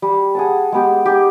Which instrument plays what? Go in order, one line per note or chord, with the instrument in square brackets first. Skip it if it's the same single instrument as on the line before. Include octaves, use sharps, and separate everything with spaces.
[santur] G3
G#4 F#5 A5
G#3 B3 G4
D#4 G4